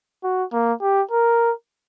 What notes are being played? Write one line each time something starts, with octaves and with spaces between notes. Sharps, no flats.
F#4
A#3
G4
A#4